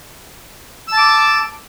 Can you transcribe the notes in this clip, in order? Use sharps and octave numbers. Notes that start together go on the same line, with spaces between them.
A5 D6 E6